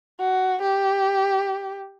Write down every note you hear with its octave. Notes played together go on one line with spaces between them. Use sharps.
F#4
G4